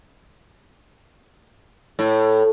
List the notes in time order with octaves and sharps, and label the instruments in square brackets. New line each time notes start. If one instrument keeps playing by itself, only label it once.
[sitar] A2